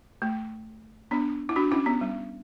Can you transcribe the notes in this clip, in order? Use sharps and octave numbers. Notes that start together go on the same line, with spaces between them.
A3
B3 D4
E4
D4 F#4
C#4 E4
B3
G3